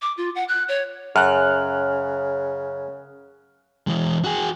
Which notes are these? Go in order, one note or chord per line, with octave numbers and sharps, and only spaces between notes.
D6
F4
F#5
F#6
C#5
F#2 C#3 F6 F#6
E3 G#3
F#4 G#4